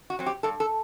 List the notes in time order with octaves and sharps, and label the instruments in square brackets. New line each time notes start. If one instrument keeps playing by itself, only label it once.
[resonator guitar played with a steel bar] F#4
F#3 C4
G4
G2 A4
A4